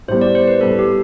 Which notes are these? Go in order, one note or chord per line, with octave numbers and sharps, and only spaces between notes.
A2 G3 B3 C5
D5
C5
B4
A2 G3 B3 A4
G4